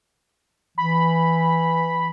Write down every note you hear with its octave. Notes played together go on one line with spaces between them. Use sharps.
E3 B5